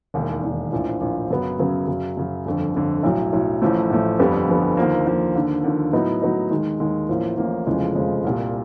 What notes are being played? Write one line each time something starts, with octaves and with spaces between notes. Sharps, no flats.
E1 D#2 D#3
E1 D#2 D#3
A#1 A2 F3
A#1 A2 F3
F#2 C#3 F#3 B3
F#2 C#3 F#3 B3
F#2 C#3 F#3
F#2 C#3 F#3
G1 F2 D3
G1 F2 D3
B1 A2 F#3
B1 A2 F#3
A1 A2 F3 A3
A1 A2 F3 A3
G1 F2 D3 G3 B3
G1 F2 D3 G3 B3
D#2 D3 F3 A#3
D#2 D3 F3 A#3
D#2 D3 F3
D#2 D3 F3
A2 F#3 B3 D#4
A2 F#3 B3 D#4
D#2 D#3 G#3
D#2 D#3 G#3
A1 A2 F3 A#3
A1 A2 F3 A#3
F1 E2 C#3 F3 G#3
F1 E2 C#3 F3 G#3
C2 A#2 G3